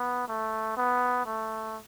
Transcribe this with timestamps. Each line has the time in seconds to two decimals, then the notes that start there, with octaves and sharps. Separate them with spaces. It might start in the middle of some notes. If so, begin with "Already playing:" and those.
Already playing: B3
0.28 A3
0.77 B3
1.26 A3